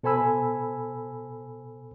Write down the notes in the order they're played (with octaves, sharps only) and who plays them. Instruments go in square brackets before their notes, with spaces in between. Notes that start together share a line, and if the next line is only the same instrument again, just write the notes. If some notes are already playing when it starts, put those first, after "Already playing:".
[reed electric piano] B2 A4 C5 G#5 B5 E6